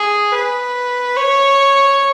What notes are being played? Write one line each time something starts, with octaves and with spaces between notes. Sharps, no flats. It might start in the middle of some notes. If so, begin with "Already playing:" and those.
Already playing: G#4
B4
C#5